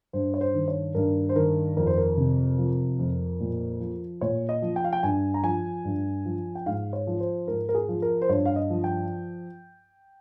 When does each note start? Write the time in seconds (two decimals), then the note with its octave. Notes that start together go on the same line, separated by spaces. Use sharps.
0.13 G2 C5
0.34 C#5
0.41 C5
0.54 D#3
0.68 C#5
0.95 G2 A#4
1.29 C5
1.36 D#3 A#4
1.77 F2 A#4
1.87 C5
1.97 A#4
2.17 C3
2.58 F3
2.99 F2
3.40 A#2
3.81 F3
4.21 A#2 C#5
4.49 D#5
4.62 F3
4.76 G5
4.84 F5
4.93 G5
5.03 G2 G#5
5.34 A#5
5.43 F3 G#5
5.85 G2
6.25 F3
6.55 G5
6.66 G#2 F5
6.93 C#5
7.07 F3
7.20 C5
7.47 G#2 A#4
7.69 A#4
7.74 G#4
7.89 F3
8.02 A#4
8.22 C5
8.29 G2 C#5
8.45 F5
8.56 D#5
8.70 F3
8.84 G5